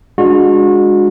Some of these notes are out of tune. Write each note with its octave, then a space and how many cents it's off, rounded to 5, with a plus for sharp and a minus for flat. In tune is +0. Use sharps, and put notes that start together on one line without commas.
G#3 -15 D4 +0 F#4 -35